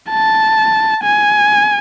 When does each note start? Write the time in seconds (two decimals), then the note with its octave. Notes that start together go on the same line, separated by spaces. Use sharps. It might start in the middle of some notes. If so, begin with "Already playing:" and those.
0.10 A5
1.03 G#5